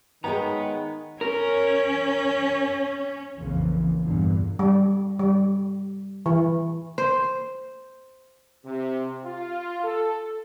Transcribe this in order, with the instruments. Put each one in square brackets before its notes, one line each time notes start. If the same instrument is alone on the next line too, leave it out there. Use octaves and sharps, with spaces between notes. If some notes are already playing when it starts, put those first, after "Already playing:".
[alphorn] D#3 [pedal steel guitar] G#3 A#5 [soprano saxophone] B3 [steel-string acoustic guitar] G#4 C#5 G5
[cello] C#4 [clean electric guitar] A#4
[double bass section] A#1 F2 C#3 E3 A#3
E2 G2 A#2 D3
[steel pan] G3
G3
E3
[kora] C5
[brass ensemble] C3
F4
A4